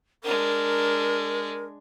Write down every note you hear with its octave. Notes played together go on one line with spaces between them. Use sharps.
G#3 D4 A#4